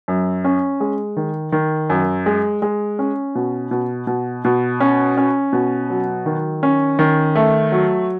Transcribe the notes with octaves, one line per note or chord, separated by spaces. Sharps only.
F#2
C#4
G#3
D#3
D#3
F#2
G#3
G#3
C#4
B2
B2
B2
B2
C#4
C#4
B2
F#3
D#3
C#4
D#3
A3
F#3